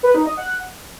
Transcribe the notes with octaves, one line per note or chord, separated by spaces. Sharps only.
B4
D#4
D#5
F#5